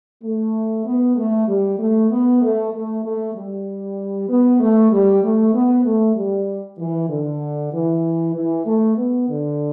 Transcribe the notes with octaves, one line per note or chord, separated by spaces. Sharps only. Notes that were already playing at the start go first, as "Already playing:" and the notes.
A3
B3
A3
G3
A3
B3
A3
A3
A3
G3
B3
A3
G3
A3
B3
A3
G3
E3
D3
E3
E3
A3
B3
D3